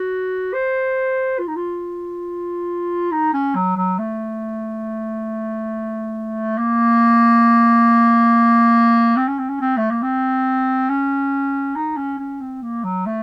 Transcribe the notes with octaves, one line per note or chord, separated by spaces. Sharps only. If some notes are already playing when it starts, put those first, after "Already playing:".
Already playing: F#4
C5
F4
D#4
F4
D#4
C#4
F#3
F#3
A3
A#3
C4
C#4
C4
C#4
C4
A3
A#3
C4
C#4
D#4
C#4
C#4
C4
A#3
F#3
A3